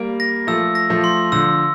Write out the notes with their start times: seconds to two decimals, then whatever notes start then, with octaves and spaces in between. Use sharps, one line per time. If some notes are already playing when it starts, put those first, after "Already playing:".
Already playing: G3 A#3 D7
0.20 A#6
0.47 F3 A3 E6
0.75 A#6
0.90 F3 A3
1.04 C6
1.32 D3 F3 E6